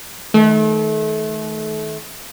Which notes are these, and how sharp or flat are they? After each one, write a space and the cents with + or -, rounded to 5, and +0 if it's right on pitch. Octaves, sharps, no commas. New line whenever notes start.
D#3 +10 A3 -30